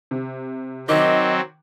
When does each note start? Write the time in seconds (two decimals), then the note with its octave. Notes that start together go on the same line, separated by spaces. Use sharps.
0.11 C3
0.89 D#3 F#3 C4 D#5 D6